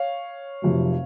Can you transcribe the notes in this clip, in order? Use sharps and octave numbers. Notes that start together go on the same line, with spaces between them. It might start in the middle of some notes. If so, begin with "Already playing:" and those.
Already playing: C#5 F5
F1 F2 C3 F#3